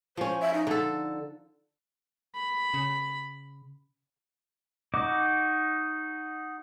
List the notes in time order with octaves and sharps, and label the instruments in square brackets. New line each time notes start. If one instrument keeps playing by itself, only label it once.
[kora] F3 C#4 [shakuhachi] C5
[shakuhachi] E5
D#4
[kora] D3 A4 [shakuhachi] D#4
[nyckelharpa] B5
[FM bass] C#3
[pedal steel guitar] D#4 F#4 D#5 D6